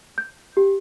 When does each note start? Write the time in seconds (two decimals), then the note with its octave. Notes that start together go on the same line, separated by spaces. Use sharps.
0.18 G6
0.57 G4